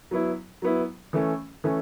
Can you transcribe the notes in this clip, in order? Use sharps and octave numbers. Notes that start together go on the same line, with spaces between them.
F#3 B3 E4
F#3 B3 E4
E3 A3 C#4
E3 A3 C#4